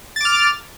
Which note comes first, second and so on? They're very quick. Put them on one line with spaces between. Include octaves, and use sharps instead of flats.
A6 D6 F6